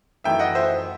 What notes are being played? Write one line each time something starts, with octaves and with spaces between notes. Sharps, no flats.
F#2 E3 A3 D#4 E5 G5
D#5 F#5
C5 E5